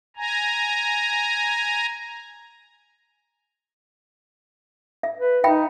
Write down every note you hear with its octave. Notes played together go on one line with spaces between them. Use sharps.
G#5 A#5
E5
B4
D#4 E5 G5 B5